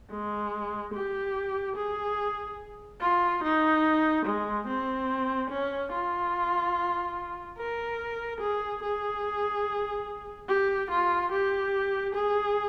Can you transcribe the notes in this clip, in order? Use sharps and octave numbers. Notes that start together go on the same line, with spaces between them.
G#3
G4
G#4
F4
D#4
G#3
C4
C#4
F4
A#4
G#4
G#4
G4
F4
G4
G#4